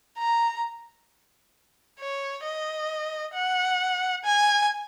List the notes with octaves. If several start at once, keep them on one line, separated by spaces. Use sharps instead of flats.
A#5
C#5
D#5
F#5
G#5